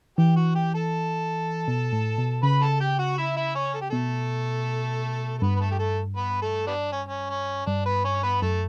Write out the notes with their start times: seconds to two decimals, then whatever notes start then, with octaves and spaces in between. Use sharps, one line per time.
0.18 E3 G4 G5
0.36 F#4 F#5
0.55 G4 G5
0.74 A4 A5
1.68 B2
1.92 A2
2.18 B2
2.43 C#3 B4 B5
2.62 A4 A5
2.80 G4 G5
2.99 F#4 F#5
3.18 E4 E5
3.36 E4 E5
3.55 C#4 C#5
3.74 A4
3.81 G4
3.90 B2 A3 A4
5.38 A4
5.42 G2 B3 B4
5.56 B4
5.60 A3 A4
5.71 G4
5.79 A3 A4
6.17 B3 B4
6.42 A3 A4
6.67 G3 B3 D4
6.93 C#4
7.09 C#4
7.30 C#4
7.66 G2 D4
7.85 B3 B4
8.05 C#4 C#5
8.23 B3 B4
8.42 F#2 A3 A4